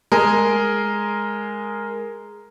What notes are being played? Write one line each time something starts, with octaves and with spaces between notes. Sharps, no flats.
G#3 G#4 A#4